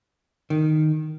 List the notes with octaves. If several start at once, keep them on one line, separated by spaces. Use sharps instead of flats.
D#3